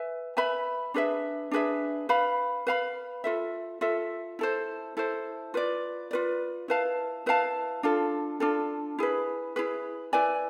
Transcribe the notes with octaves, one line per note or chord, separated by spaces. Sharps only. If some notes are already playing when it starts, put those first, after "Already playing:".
Already playing: B4 E5 G#5
B4 E5 G#5 B5
D4 G#4 B4 E5
D4 G#4 B4 E5
B4 F5 B5
B4 F5 B5
F4 A4 E5
F4 A4 E5
E4 A4 C5
E4 A4 C5
F4 B4 D5
F4 B4 D5
E4 B4 F5 A5
E4 B4 F5 A5
D4 F4 A4
D4 F4 A4
E4 G#4 B4
E4 G#4 B4
E4 B4 D5 G#5